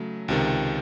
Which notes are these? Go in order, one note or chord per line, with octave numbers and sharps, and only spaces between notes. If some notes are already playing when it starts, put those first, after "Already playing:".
Already playing: C#3 F#3 A3
C#2 C3 D#3